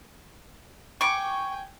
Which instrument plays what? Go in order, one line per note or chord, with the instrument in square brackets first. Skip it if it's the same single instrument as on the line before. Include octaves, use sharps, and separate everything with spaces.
[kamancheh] G5 G#5 [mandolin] C#6 D6